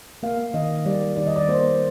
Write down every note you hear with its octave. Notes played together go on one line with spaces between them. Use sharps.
A#3 F5
D#3 D#5
G3 D5
D#3 D5
D#5
D5
A#3 C5